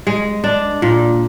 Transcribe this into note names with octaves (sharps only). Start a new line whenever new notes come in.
G#3
D4
A#2